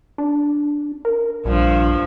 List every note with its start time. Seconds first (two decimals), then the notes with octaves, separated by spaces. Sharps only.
0.18 D4
1.05 A#4
1.45 A#1 G2 F3